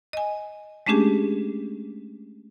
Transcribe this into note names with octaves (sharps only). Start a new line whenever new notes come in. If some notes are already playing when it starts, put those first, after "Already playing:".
D#5 G#5
G#3 A3 C#4 D4 G4 G#4